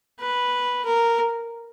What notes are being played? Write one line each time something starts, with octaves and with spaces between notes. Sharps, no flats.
B4
A#4